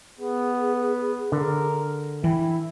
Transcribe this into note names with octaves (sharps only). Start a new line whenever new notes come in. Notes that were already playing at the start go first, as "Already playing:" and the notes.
B3 G#4
D3 A#4
E3 E4 G5